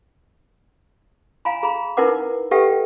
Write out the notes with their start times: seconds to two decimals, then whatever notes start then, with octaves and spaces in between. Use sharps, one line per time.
1.45 F5 G#5 A#5 B5
1.63 G#4 A#5 B5
1.97 D#4 E4 A#4 B4 F#5 D6
2.51 G4 A4 B4 E5 F#5 G5